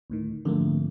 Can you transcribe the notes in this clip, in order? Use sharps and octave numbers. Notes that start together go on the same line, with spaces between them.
D2 A2 D#3
F2 G#2 D3 A3 A#3